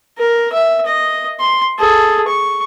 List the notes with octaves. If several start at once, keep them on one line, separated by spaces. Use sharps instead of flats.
A#4
E5
D#5
C6
G#4 A4
C#6